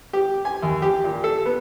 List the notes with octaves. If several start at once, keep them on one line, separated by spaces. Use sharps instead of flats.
G4
G#5
D#2
G4
A#2
A4
B3